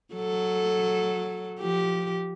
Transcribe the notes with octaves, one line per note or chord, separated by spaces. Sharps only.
F#3 A4
F3 G4